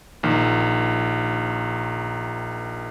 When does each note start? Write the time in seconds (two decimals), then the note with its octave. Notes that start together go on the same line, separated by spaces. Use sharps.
0.23 A#1 D#3